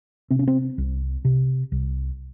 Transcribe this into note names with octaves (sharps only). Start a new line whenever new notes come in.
C3 C4
C#4
C4
C2
C3
C2